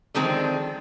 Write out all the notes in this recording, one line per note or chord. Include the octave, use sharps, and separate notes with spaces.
D3 D#3 F3 G#3 C4